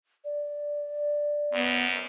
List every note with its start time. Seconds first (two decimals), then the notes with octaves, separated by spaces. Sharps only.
0.25 D5
1.53 F#2 B3